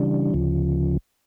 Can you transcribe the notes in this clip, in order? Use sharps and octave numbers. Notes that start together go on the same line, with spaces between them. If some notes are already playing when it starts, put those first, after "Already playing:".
Already playing: C#3 E3 G3 D4
D2 C#3 F3